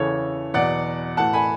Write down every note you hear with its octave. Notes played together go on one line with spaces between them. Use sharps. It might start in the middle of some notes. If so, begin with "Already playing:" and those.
Already playing: E2 C#3 E3 A4 C#5
E2 B2 F#3 D5 F#5
A2 E3 F#5 A5
G#5 B5